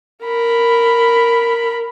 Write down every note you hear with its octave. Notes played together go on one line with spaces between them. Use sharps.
A#4 B5